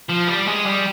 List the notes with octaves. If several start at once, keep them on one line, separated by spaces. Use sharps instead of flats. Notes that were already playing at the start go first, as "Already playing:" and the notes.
F3
G3
G#3
G3